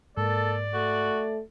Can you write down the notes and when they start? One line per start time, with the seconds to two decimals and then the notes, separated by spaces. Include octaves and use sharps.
0.17 G#2 A#3 A4 D5
0.74 A3 F#4